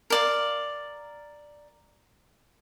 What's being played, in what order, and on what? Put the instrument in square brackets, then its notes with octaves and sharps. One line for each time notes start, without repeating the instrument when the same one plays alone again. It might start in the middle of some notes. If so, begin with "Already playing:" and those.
[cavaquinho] A#4 D5 F5